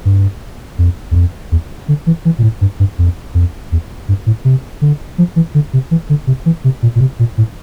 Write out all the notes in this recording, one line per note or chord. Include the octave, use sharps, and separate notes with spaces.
G2
F2
E2
F2
E2
D3
E3
E3
A#2
A2
G2
G2
F2
F2
E2
G2
A2
C3
D3
F3
E3
D3
C3
E3
D3
C3
E3
C3
A#2
A#2
C3
A#2
A2